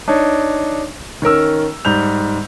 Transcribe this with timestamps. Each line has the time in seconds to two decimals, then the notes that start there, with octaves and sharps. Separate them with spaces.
0.08 D4 D#4 C#5
1.22 D#3 C#4 A#4 E6
1.85 G#2 G3 G6 F7